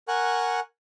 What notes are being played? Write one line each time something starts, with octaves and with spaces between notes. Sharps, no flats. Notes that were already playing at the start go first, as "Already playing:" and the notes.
A#4 F#5 G#5 C#6 F#6